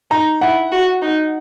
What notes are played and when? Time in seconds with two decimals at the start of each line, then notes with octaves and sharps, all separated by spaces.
0.11 D#4 A#5
0.41 E4 F#5
0.72 F#4
1.02 D#4